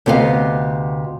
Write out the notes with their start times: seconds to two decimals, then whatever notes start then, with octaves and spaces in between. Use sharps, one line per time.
0.06 D2 C3 B3 D#5 F5